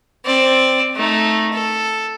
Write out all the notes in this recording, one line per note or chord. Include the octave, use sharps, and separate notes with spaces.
C4 D5
A3 D#4
A4